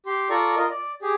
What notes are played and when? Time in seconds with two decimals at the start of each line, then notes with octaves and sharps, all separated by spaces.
0.06 G4 C6
0.30 F4 A4 D5 A#5 C#6
0.57 F4 A#4 D#5
0.71 D5
1.02 G4 G#4